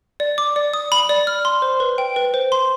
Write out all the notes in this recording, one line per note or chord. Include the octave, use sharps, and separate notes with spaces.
D5
D6
D5
D#6
B5
D5
F6
C6
C5
B4
G5
B4
C5
C6